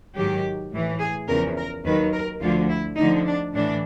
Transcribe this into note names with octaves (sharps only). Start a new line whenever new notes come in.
G#2 D#3 F#3 G4
A2 E3
G#4
E2 C#3 F3 A#4
A#4
D#2 D#3 F#3 B4
A#4
D2 D3 F3 F4
E4
D2 D3 F3 D#4
D4
A2 E3 D4